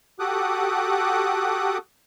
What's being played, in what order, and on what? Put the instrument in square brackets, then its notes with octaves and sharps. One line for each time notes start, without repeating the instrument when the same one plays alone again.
[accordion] F#4 G4 A4 D6 D#6 F#6